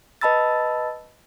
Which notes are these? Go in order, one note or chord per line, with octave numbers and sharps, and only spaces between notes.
B4 D#5 A5 B5 E6 A6